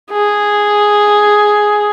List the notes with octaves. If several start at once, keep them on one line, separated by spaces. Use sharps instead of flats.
G#4